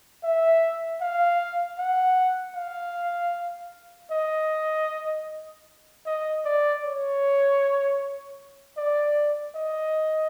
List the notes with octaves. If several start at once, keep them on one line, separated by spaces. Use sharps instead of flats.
E5
F5
F#5
F5
D#5
D#5
D5
C#5
D5
D#5